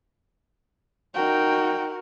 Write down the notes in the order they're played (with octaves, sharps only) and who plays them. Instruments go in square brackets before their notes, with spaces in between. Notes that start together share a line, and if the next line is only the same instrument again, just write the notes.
[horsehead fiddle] D#4 G5 [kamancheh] F#4 A#4